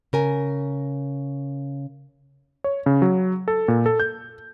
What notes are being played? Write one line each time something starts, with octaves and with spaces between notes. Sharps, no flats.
C#3 A#4 G#5
C#5
C#3
F#3
A4
A#2
A4
G6